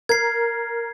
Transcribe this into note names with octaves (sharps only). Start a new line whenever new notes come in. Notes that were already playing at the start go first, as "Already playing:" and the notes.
A#4 G#6 C7